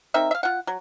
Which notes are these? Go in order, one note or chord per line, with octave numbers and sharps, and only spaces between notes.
C4 D#4 A#4 E5
E5 F5
F4 F#5
F#3